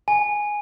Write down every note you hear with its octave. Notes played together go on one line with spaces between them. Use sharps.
G#5